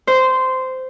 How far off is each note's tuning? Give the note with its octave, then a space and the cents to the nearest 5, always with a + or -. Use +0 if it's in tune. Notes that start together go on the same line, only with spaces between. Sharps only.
C5 -15